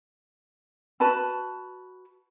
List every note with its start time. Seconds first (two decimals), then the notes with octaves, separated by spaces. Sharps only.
1.00 F#4 B4 A5 B5